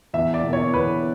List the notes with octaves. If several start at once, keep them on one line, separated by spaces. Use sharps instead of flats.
E2 E5
D5
B2 A#3
C#5
E2 B4